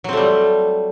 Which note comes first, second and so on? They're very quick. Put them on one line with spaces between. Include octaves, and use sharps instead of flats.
F#3 C4 A3 G3